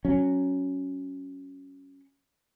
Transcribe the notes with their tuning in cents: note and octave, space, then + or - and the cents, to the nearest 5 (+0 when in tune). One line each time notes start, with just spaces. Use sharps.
F#3 +0 C#4 +0